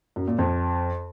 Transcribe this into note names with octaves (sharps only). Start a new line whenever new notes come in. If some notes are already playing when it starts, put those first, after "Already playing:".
F#2
A#2
F2